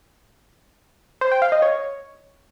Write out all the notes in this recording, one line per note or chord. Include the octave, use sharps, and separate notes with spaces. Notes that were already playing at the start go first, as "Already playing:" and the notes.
C5
G5
F5
D#5
C#5